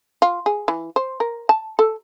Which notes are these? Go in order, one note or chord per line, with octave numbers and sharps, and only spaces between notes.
F4
G#4
E3
C5
A#4
A5
A4